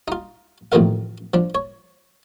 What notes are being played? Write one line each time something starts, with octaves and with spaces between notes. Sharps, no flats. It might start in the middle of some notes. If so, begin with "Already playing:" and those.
D#4 F4
A1 F2 D#3 D#4 A#4 F5
F3 D4
C#5